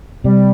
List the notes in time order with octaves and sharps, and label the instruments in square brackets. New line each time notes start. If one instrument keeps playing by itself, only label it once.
[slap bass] C3 [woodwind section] G3